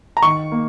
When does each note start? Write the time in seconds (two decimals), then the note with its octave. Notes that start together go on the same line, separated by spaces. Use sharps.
0.17 A#5
0.22 D#3 C#6
0.52 A#3